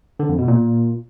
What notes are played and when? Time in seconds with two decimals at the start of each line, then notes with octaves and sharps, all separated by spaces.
0.19 D3
0.29 F2
0.38 B2
0.48 A#2